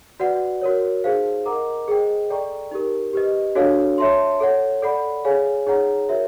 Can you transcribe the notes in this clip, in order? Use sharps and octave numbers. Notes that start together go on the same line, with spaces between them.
F#4 B4 D5 F#5
F#4 A#4 C#5
D#4 G#4 C5 F5
A#4 D#5 F#5 A#5 D6
G#4 C5 D#5 G5
A4 D5 G5 A#5 C#6
D#4 G4 A#4
G4 B4 D#5
D4 F#4 A4 C#5 F5
C#5 E5 A5 C6
A4 C#5 F#5
A4 D5 F#5 B5
G#4 C#5 F5 G#5
D#4 G#4 C#5 F#5 A#5
F#4 A#4 C#5 E5